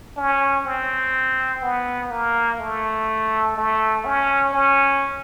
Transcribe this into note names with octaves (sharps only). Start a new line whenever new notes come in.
C#4
C4
B3
A#3
A3
A3
C#4
C#4